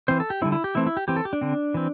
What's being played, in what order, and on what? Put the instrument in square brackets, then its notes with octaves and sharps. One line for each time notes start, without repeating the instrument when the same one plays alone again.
[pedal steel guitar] E3 C4 C5
A4
G4
D3 G3 C4 E4
E4
G4
E3 A3 C4 E4
E4
G4
E3 C4 G4
A4
G4
D4
D3 C4
E3 C4